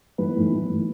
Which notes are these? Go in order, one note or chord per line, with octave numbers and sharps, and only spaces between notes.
A1 B4
A2 E3
A1
A2 E3